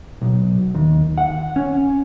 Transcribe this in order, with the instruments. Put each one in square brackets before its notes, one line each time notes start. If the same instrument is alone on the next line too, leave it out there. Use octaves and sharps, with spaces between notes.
[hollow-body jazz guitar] B1
D#2
F#5
C#4